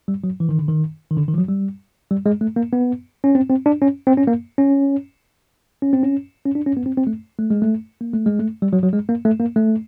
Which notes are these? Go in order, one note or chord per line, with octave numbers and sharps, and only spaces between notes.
G3
F#3
E3
D#3
D3
D#3
D#3
D3
D#3
F3
F#3
G3
G3
G#3
A3
A#3
B3
C#4
C4
C4
D4
C#4
C4
C#4
A#3
C#4
C#4
C4
C#4
C#4
D4
C#4
B3
C4
C4
A3
A3
G#3
A3
A#3
A3
G#3
A3
G3
F#3
F#3
G#3
A#3
A3
A#3
A3